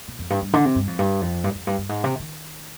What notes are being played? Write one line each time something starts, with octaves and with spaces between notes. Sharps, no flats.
B2
F2
G2
G2
D3
C3
G2
F2
G2
F2
G2
F2
G2
G2
G#2
C3
D#3